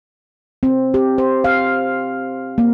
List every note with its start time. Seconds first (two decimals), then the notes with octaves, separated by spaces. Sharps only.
0.63 C4
0.94 G4
1.18 C5
1.44 F5
2.58 A#3